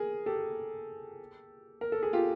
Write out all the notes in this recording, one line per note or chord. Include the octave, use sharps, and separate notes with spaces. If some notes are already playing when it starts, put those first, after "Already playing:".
Already playing: G#4 A#4
G4 A4
A#4
A4
G#4
F4 G4